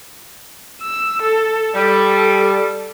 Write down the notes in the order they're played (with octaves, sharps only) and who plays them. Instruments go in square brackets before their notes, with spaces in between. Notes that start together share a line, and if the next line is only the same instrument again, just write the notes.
[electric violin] E6
A4
[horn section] G3 [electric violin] A4